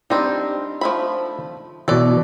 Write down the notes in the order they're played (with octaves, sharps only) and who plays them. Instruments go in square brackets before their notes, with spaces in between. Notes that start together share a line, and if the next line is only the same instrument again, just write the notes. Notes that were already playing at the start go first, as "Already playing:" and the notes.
[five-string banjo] G3 C4 [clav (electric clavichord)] D4 D#4
[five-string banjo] F3 A3 B5
[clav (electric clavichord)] B2 E3 [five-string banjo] A4 D5